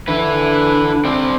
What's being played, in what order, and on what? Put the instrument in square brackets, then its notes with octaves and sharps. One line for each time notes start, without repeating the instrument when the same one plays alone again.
[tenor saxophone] D3 [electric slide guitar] E4 B4
[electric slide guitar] C4 D5